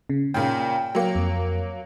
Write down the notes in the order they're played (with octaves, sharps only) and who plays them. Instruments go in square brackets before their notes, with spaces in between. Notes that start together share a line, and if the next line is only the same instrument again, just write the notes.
[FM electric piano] C#3
[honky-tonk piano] A#2 C#3 [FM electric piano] G5
[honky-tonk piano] F#3 A#3
[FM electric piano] F2